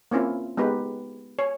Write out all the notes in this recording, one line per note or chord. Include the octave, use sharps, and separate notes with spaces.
A#3 C4 C#4 E4 F4
G#3 B3 D#4 G4 B4
C#5